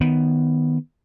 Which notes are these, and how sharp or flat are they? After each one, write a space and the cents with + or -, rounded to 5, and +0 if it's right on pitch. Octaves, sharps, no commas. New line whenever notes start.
D#3 +0 B3 +0